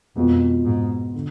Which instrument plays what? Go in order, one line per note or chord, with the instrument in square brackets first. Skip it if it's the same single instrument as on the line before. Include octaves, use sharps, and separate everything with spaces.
[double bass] F2 [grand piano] B2 G#3 B3 F4
[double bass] G#2
[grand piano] D3